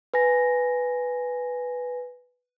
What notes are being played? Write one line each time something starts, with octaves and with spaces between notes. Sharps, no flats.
B4 G#5 A#6